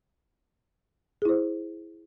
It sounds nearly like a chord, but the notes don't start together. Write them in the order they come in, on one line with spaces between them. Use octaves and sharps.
G#4 E4 C5